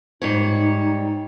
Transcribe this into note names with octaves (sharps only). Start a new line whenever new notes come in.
G#2 G3 D#4 C#5